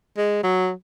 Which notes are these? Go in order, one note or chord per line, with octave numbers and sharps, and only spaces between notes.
G#3
F#3